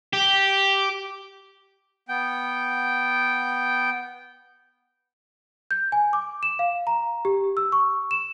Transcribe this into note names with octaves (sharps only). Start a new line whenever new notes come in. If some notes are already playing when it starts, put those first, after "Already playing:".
G4
B3 G5
G6
G#5
D6
E7
F5
A#5
G4
E6
C#6
E7